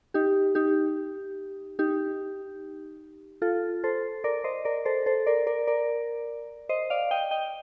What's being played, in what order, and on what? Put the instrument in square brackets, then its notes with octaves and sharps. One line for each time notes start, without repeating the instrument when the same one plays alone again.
[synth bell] D#4 G4
D#4 G4
D#4 G4
F4 A4
A4 C5
A#4 D5
C5 D#5
A#4 D5
A4 C5
A4 C5
A#4 D5
A#4 D5
A#4 D5
C5 D#5
D5 F5
D#5 G5
D#5 G5